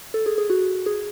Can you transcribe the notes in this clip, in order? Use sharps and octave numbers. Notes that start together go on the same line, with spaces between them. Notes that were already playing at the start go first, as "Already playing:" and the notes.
A4
G#4
G#4
F#4
G#4